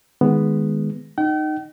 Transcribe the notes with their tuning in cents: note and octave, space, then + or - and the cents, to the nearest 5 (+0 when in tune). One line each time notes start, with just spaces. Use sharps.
D#3 +0 G#3 +0 B3 +0
D#4 -20 G5 -45